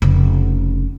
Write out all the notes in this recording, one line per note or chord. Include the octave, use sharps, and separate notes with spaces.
F1 C#3